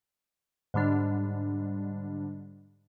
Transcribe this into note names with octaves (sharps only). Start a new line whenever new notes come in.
G#2 D3 G3 D4